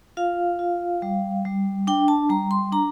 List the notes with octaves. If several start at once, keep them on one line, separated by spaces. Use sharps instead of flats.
F4 F5
F4
G3
G3
D4 G5
A5
G3 A#5
C6
D4 A#5